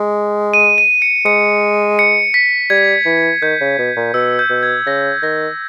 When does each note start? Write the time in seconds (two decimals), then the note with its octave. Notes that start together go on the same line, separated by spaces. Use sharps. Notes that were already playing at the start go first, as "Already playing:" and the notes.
Already playing: G#3
0.54 D#7
0.78 D#7
1.02 C#7
1.26 G#3 C#7
1.99 C#7
2.34 B6
2.70 G3 G#6
3.06 E3
3.42 D#3 G6
3.61 C#3
3.79 B2
3.97 A#2
4.14 B2 E6
4.39 G6
4.50 B2
4.63 G#6
4.86 C#3 A#6
5.23 D#3 A#6